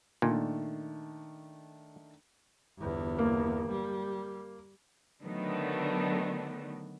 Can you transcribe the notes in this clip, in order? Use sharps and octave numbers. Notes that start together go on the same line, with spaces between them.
A#2 D#3 A3 D4
G1 E2
A#3
G3
D3 D#3 F#3 A3 B3 D4